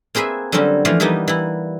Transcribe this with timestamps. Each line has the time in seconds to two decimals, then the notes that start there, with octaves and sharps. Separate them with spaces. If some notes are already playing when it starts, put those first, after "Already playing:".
0.15 A#3 C4 G#4 B4 E5
0.52 D3 F#3 G3 C4 C#4
0.85 E3 F3 A3 D5 F5
1.00 E3 G3 A#3 B3 D#4
1.28 E3 E4